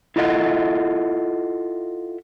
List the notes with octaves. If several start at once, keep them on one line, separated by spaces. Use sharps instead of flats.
E4 F4 A4 D#5 E5 F#5